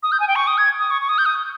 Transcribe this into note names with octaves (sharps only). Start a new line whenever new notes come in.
D#6
G6
G#5
G5
C#6
D#6
G#6
D#6
C#6
C#6
D#6
G6
D#6